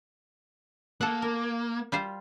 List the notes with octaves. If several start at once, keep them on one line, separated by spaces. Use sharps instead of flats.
A#3 A4 F#5
A#4
G3 F4 C5